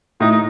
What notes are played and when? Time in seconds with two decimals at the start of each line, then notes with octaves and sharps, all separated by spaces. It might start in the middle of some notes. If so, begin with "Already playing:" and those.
0.20 A2 D#4
0.31 D#4